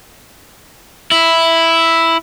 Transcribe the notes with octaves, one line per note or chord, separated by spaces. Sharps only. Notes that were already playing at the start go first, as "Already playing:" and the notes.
E4